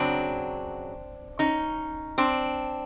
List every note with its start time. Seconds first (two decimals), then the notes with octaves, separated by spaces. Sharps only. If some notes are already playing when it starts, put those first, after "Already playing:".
Already playing: F#2 C#3 F#3 C4 D4
1.39 C#4 D#4
2.18 C4 D4